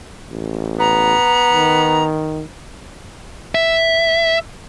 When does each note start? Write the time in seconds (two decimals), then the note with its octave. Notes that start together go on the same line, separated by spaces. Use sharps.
0.31 A1
0.79 B3 A#5
1.52 D#3
3.55 E5